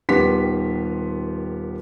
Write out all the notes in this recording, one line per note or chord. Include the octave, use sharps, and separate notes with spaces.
D#1 D#3 B3 G4 C6 B6